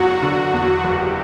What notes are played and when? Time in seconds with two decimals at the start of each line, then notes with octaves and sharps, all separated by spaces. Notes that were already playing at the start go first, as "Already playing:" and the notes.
Already playing: F#1 E2 F#3 F#4
0.22 D3
0.53 E2
0.83 F#1 G4